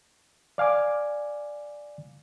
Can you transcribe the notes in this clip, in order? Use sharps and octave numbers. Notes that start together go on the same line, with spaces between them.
D5 F5 G#5 D6